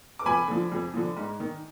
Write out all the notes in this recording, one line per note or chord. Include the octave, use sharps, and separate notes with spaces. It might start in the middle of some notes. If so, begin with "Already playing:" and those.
D6
F2 G#5 B5
D3 F3
F2
D3 F3
G#2
D#3